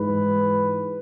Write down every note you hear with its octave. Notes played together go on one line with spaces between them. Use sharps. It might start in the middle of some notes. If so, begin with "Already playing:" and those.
Already playing: G#2 E3 G#3 B4